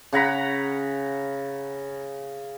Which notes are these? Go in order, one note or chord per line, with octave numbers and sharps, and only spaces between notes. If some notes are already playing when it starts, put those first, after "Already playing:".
C#3 F#5 A#5 B5